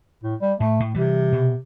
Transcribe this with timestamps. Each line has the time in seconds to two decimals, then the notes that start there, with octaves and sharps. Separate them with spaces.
0.23 A2
0.41 G3
0.60 A2 A3
0.80 A2
0.94 C3 E3 G3
1.32 B2